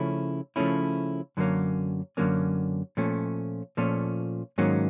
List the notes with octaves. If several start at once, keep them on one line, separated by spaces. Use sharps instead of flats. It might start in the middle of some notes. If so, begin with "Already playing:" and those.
Already playing: C#3 F3 A3 C#4 E4
C#3 F3 A3 C#4 E4
F#2 D3 F#3 A#3 C#4
F#2 D3 F#3 A#3 C#4
A#2 F3 A3 C#4
A#2 F3 A3 C#4
G#2 D#3 F#3 A#3 C#4